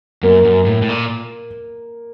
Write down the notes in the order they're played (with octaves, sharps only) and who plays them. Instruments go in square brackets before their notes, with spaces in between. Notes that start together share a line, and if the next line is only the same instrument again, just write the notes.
[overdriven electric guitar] F#2 [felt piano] A#3
[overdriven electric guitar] F#2
A2
A2
A#2